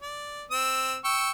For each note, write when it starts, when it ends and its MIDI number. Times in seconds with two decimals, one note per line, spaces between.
0.01 0.44 74
0.51 0.98 60
0.51 0.98 88
1.04 1.31 79
1.04 1.31 85
1.04 1.31 88